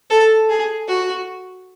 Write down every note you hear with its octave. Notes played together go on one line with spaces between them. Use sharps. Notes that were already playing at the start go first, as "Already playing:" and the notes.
A4
G#4
F#4